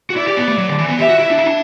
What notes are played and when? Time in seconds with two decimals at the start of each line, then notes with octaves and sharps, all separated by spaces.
0.10 F#4
0.16 E4 D5
0.27 G4
0.37 B3
0.48 A3
0.58 F#3
0.68 D3
0.79 E3
0.89 B3
0.99 G4 E5
1.09 F#4
1.19 E4
1.30 D4
1.38 E4
1.46 D4